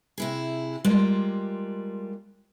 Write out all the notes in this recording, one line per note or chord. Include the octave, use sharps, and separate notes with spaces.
C3 E4 G#4
G3 G#3 A#3 F4